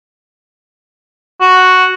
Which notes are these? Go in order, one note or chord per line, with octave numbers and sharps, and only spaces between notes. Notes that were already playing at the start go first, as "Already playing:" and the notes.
F#4